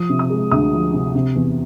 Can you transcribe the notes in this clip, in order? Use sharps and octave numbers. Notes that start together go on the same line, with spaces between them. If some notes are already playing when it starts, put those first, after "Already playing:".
Already playing: F3 D#6
C3
D#6
G#3
D2 D#6
F3
C3
C3
E2